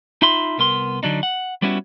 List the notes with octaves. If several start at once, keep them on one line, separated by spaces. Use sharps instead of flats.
D#4 F4 E5 B5 C6
C2 B3 A#4 C6
D3 F#3 D4 D#4
F#5
G3 B3 C#4 E4 F#4